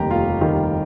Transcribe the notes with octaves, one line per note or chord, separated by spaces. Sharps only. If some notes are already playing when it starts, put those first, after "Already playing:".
Already playing: F1 D#2 D#3 G3 G4 A#5
F1 F4
D#2 D#3 G3